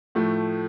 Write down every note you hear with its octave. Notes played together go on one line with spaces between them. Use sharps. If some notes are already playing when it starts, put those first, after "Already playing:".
A2 F3 A3